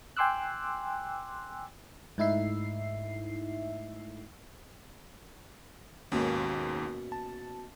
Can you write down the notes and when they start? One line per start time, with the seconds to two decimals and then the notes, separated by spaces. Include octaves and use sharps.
0.17 G5 G#5 C6 D6 E6 F#6
2.18 G#2 A3 D#4 E4 E5 C7
6.12 D#2 G#2 B2 A#3 C#4
7.12 A5